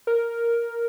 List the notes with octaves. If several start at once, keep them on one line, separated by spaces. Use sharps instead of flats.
A#4